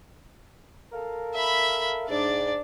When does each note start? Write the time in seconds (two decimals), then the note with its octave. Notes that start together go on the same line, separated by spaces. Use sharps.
0.92 A4 A#4 F5
1.34 E5 B5
2.09 G#2 D4 D5